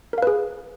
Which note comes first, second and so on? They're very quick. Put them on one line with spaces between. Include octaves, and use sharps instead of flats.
A#4 F5 B4 G#4